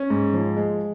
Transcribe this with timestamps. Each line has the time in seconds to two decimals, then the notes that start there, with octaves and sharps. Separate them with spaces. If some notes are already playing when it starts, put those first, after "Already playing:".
Already playing: C#4
0.10 G#2
0.34 F3
0.57 G#3